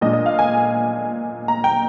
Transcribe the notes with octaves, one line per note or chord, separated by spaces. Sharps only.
A#2 G#3 D4 D#5
D#5
F5
G#5
A#5
G5